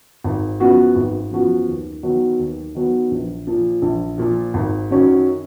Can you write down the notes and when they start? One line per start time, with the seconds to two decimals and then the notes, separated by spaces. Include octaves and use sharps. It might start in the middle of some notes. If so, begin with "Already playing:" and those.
0.24 G#1
0.60 F#2 F3 B3 F#4
0.96 G#1
1.32 F#2 F3 B3 F#4
1.68 D#2
2.03 D#3 F#3 B3
2.39 D#2
2.75 D#3 F#3 B3
3.11 A#1
3.47 A#2 F3
3.82 A#1
4.18 A#2 F3
4.54 G#1
4.91 F#2 D#3 F#3 C#4